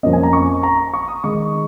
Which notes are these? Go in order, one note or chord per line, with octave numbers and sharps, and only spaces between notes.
F2 F3 A#3 C#4 D#5
G#5
A#5
C#6
A#5
C#6
D#6
D#3 G#3 D#4 C#6